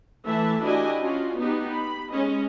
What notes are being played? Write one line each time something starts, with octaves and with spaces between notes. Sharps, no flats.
E3 A3 E5 A5
D4 E4 F#4 G4 D#5 G#5
C#4 F4 F#4
B3 D#4 G4
B5
G#3 C#4 D#5